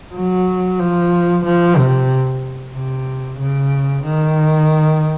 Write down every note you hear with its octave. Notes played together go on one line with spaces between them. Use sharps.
F#3
F3
F3
C3
C3
C#3
D#3